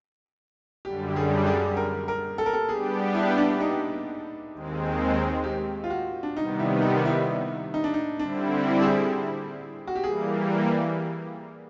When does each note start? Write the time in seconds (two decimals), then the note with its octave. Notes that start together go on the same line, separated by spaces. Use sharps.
0.85 F#2 D3 G3 G4
1.10 G4
1.16 G#4
1.46 G#4
1.77 A#4
2.08 A#4
2.38 A4
2.46 A#4
2.53 A4
2.69 G3 B3 D4 G4 G#4
3.15 E4
3.38 D4
3.61 D#4
4.52 D#2 D#3 G#3 C4
5.44 G4
5.84 F4
5.90 F#4
6.23 D4
6.36 C3 D#3 G3 B3 D#4
6.59 E4
6.82 D#4
7.05 E4
7.74 D#4
7.84 D4
7.94 D#4
8.19 D3 G3 C4 D4 E4
8.81 G#4
9.87 F#4
9.96 G4
10.03 E3 G3 A#3 G#4